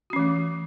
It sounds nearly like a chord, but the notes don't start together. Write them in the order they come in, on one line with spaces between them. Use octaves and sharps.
F#4 C#4 E3 A3